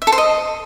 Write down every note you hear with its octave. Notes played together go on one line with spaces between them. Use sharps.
E5
A4
C5
D#5